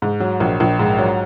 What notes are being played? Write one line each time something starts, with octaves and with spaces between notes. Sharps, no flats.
G#2
F#3
A#1
A#1
G#2
F#3